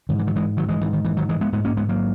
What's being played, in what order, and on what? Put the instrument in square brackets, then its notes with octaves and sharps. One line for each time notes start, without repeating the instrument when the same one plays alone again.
[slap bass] G#2 D#3
E3
D#3 F#3
E3 G#3
D#3 F#3
E3 G#3
G#2 E3
D#3
E3
D#3 F#3
E3 G#3
G#3 B3
G#2 G#3 B3
A#3 C#4
G#3 B3
F#3 A#3